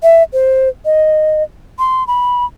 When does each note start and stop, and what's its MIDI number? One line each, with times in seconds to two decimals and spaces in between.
0.03 0.23 76
0.33 0.69 72
0.85 1.43 75
1.79 2.06 84
2.07 2.45 83